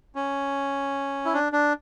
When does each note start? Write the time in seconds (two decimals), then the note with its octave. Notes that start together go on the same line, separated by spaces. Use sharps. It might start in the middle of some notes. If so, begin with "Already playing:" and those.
0.15 C#4
1.25 E4
1.34 D4
1.52 D4